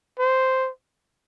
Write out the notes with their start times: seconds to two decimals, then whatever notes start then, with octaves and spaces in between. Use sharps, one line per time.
0.19 C5